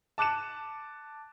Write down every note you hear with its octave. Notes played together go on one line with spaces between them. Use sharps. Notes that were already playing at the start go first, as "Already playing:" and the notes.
A5 D6 F#6 C#7 E7